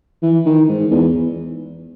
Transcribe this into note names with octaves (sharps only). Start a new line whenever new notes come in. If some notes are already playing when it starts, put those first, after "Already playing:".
E3
D#3
G#2
E2